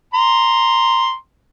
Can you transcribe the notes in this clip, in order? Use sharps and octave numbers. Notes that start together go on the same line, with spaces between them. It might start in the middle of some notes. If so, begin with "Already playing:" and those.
A#5 C6